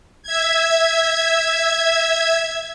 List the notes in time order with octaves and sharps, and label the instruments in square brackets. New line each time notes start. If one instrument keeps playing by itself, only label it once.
[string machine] E5 G#6